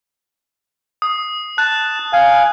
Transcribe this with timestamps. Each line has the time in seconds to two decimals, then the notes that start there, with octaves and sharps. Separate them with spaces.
1.02 D#6
1.58 A5 F#6
2.13 F5 G#5